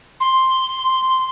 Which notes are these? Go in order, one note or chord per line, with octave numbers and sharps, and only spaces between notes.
C6